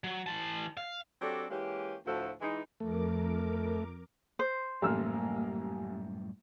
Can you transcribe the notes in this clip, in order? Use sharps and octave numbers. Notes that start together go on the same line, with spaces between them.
F#3
E3 A5
F5
F#3 C4 D4 G4 A4 D5
E3 G#3 A#3 C#4 G4
D2 A2 F3 A3 F#4 A4
E3 G#3 D#4
F2 A3 A#4 D6
C5
A1 F#2 A2 G3 A#3 E6 F6